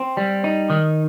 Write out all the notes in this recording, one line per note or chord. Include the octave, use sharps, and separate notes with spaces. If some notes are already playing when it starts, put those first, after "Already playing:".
Already playing: C4
G3
D#4
D#3